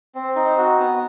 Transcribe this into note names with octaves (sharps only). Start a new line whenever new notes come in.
C4
D#4
F#4
B3